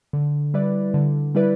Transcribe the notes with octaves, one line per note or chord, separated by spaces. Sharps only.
D3
G3 E4 B4 D5
D3
G3 E4 B4 D5